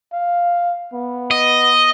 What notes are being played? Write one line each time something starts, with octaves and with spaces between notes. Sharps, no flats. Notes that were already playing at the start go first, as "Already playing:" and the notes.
F5
B3
D#5